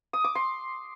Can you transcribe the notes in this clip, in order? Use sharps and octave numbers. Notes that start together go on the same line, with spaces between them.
D#6
D6
C6